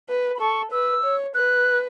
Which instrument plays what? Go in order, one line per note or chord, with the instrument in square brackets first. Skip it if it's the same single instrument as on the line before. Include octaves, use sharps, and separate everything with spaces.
[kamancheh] B4
[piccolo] B5
[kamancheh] A4 [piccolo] C#6
[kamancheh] B4 [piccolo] E6
[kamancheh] C#5
[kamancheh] B4 [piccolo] F#6